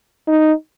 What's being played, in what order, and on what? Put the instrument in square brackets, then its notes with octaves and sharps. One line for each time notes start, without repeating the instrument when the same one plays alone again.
[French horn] D#4